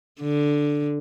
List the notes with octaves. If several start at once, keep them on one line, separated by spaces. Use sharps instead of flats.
D3